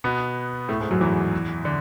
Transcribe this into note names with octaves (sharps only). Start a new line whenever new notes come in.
B2 B3
A2 A3
G#2 G#3
F#2 F#3
E2 E3
D3